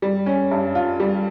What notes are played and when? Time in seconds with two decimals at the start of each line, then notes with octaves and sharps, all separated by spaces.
0.02 G3
0.26 C#4
0.51 G2
0.75 F4
1.00 G3